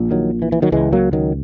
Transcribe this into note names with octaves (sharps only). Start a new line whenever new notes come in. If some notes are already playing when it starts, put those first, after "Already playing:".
Already playing: A#1 A#2
D#3 F#3
E3
E3
D#3 F#3
C#2 C#3 E3 G#3
F#3 A#3
D#3 F#3